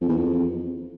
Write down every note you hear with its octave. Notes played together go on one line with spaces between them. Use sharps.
F2
E2
F2